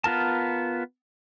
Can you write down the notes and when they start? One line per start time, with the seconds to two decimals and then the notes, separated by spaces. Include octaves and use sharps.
0.04 B3 F4 A#4 A5